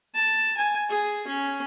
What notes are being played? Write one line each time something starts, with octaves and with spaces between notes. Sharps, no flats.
A5
G#5
G#4
C#4